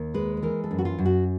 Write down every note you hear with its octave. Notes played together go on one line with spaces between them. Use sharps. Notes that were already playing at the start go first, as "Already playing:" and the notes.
Already playing: D#2
G#3 B4
B4
E3 A#4
A4
F#2
F#4
F4
F#2
F#4